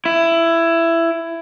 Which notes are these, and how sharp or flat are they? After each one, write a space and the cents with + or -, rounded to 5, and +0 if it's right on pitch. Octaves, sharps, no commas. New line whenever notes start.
E4 +15